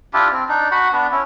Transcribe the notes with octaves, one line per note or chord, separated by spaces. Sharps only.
D4 E4 F4 G4
C4
D4 D#4
F#4 F#5 B5
B3 D4
C#4 E4